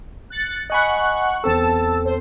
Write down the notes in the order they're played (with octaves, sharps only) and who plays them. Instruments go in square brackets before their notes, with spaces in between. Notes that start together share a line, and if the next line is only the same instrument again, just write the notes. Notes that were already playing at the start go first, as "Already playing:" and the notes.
[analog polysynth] F#6 A6 C#7
[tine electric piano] D#5 G#5 B5 [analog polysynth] F#5 C#6 F#6
[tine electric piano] E2 C4 A4 [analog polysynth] A5 E6
[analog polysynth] C5